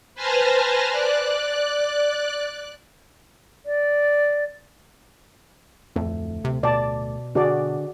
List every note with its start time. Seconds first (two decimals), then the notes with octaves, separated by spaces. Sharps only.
0.15 B4 C5 G#5 A5 F6 A#6
0.92 D5 F#6
3.66 D5
5.96 D1 F2 A3
6.45 C3
6.63 B2 D5 A5
7.35 D3 D4 F#4 G#4 D5